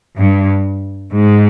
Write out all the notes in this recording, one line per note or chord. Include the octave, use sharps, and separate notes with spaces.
G2
G#2